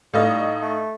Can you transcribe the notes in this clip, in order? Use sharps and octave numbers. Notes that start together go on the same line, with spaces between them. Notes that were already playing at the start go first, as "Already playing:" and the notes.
A2 G3 D#4 A4 D#5 F5
A3